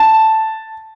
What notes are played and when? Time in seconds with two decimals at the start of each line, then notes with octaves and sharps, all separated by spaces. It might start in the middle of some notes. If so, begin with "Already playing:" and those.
Already playing: A5